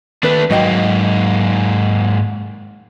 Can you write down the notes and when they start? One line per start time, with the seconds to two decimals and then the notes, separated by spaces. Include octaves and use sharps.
0.23 D#2 A3 D4 B4
0.51 G#2 F#3 A#3 D#5 G5